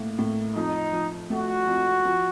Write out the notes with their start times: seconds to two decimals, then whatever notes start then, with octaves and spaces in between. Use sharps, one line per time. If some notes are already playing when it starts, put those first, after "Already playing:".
Already playing: A2 A#3
0.18 A2
0.55 F2 D#4
0.93 F3
1.30 A3 F#4
1.67 F2
2.05 F3